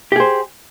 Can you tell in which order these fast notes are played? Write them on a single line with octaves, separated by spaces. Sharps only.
G4 G#4 C5